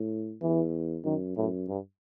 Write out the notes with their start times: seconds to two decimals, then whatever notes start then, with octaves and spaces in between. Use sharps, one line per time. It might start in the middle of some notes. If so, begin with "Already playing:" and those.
Already playing: A2
0.42 E2 E3
1.05 F#2 D#3
1.37 F#2 A2
1.68 G2